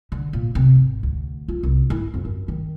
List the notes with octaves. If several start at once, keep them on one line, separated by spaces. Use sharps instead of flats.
D3
A#2
C3
G#1
D2
F4
C2
E4
F2
F#2
D#3